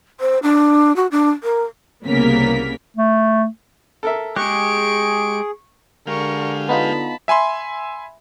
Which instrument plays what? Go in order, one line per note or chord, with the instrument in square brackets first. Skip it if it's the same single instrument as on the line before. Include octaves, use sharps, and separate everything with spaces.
[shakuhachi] C5
D4
F#4
D4
A#4
[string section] C2 C#3 A#3 B3 A#4 B6
[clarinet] A3
[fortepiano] A4 A#4 E5
[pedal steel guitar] G#3 G4 [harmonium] G#4 [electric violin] C#6 D7 [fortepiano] F#6
[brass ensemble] D3 [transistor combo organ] G#3 G4 F5 [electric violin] A#4 C#6
[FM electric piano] B3 D#4 F4 [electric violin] A5 B5
[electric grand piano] E5 G#5 B5 C6